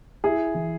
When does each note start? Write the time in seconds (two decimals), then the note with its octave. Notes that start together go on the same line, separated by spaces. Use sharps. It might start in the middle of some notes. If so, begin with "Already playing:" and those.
0.24 E4 G#4
0.54 E3